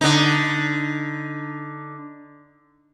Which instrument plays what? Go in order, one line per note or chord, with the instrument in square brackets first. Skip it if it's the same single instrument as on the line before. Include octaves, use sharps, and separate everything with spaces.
[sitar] D3 D#4